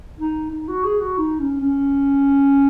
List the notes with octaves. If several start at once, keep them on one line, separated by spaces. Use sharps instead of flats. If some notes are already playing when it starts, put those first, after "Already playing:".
D#4
D#4
F#4
G#4
F#4
D#4
C#4
C#4